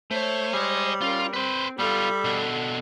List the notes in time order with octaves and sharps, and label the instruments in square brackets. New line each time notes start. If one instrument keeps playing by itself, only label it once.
[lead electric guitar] A3 [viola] C5 C#5
[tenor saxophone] G3 [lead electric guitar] G#4 D#5
[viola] C#4 A#4 [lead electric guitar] F4
[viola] C4 [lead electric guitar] B4 C5
[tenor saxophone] G3 [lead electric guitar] B3 F4 [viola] A4 E5
[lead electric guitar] B2 D4